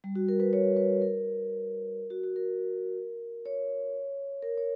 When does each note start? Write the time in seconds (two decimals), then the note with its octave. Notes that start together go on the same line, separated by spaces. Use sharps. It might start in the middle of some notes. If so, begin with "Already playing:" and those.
0.04 G3
0.16 F#4
0.29 A#4
0.40 B4
0.53 C#5
0.77 B4
1.02 A#4
2.10 F#4
2.23 F#4
2.36 A#4
3.45 C#5
4.42 A#4
4.57 C#5